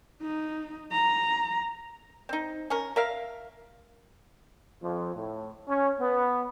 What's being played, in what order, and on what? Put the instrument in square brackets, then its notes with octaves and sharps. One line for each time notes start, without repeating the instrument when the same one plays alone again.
[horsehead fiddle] D#4
A#5
[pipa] C4 D#4
C#4 A#4
A#4 E5 F5
[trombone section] F2
A2
C#4
B3